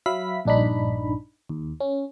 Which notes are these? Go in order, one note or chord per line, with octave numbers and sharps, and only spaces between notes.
F#3 E5 F5 B5 B6
A#1 G2 D4 D#4 B5
D#2
C#4